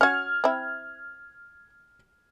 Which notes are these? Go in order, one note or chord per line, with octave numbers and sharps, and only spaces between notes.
C#4 F#4 F6 G#6
C4 E4